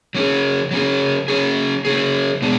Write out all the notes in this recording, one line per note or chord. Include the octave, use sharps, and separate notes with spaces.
F#3 C#4 G#4
F#3 C#4 G#4
F#3 C#4 G#4
F#3 C#4 G#4
B2 G#3 D4